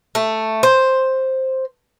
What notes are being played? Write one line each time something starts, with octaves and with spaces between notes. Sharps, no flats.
A3
C5